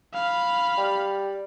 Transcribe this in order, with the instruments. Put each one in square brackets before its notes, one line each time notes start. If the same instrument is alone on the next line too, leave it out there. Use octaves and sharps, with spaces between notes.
[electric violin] F5 B5
[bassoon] G3